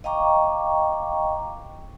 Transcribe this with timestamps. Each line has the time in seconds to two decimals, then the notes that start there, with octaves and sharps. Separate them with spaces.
0.04 D#5 F5 G5 A#5 C#6 D6